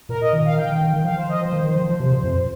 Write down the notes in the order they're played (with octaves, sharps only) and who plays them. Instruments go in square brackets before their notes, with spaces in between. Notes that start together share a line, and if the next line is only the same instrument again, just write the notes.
[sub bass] A#2 [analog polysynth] A#4
[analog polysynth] D#5
[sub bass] D#3
[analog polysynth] F5
G5
[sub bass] D#3
D#3
D#3
[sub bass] F3 [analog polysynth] F5
[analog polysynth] C5
D#5
[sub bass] F3 [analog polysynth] C5
[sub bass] D#3
D#3
F3
F3
C3
A#2
F2